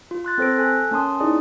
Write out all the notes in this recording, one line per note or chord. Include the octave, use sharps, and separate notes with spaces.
F4
C6 F#6 A6
C4 A4 C5 A#6 D7
A4 G#5 F#6
A#3 C#4 A5 C6 D#6
D#4 E4 G#4 D5 D#6